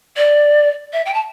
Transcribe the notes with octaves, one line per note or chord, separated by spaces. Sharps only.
D5
E5
G5
A5